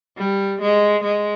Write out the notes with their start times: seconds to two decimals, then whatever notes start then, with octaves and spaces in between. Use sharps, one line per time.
0.17 G3
0.61 G#3
1.03 G#3